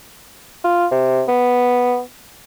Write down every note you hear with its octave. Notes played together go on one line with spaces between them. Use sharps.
F4
C3
B3